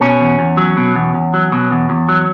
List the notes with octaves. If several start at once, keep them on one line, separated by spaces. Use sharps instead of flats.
B2 C#4
E2
E2
F#3
B2
E2
E2
F#3
B2
E2
E2
F#3